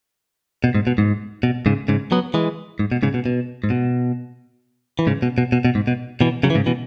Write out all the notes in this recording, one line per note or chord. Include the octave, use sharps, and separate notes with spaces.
B2
G#2
B2
G#2
B2
G#2 C#3
G#2 C#3
F#3 B3
E3 G#3
G#2
B2
G#2 C#3
B2
B2
G#2
B2
E3
G#2 C#3
B2
B2
B2
B2
G#2
B2
B2 E3
C#3 F#3
E3
G#2 C#3
B2 E3